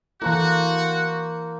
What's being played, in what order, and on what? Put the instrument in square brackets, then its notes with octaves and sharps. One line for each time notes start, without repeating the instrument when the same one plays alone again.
[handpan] E3 E4 [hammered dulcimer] A#3 C5 A5 [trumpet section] F#4